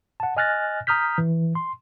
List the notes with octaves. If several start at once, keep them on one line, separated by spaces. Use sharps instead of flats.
F#5 A5
D#5 G#5 F6 F#6 A6 A#6
A#5 D#6 F6 G6 B6
E3
C6